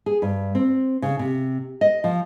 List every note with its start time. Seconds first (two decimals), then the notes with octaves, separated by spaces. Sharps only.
0.06 G#4
0.22 G2
0.55 C4
1.02 C#3
1.19 C3
1.81 D#5
2.04 F3